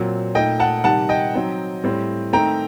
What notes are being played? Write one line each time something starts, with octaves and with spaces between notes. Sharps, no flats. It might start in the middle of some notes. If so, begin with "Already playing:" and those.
Already playing: A#2 F#3 C4
A#2 A3 D#4 D#5 G5
F#5 A5
C3 D#3 G3 F#5 A5
D#5 G5
F#3 C4 D#4
A2 G3 C4
D#3 A3 C4 D#4 G5 A#5